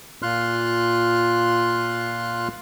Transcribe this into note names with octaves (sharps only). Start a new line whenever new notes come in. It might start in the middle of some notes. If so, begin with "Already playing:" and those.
A#2 F4 C6 F6 F#6